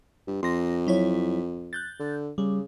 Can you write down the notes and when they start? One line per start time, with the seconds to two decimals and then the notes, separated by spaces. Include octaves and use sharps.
0.28 G2
0.43 F2 C6 A#6
0.87 F#3 E4 C#5
1.73 F#6 G6 A6
2.00 D3
2.38 C#3 G3